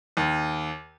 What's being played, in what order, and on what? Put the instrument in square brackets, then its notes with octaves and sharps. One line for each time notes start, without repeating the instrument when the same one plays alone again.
[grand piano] D#2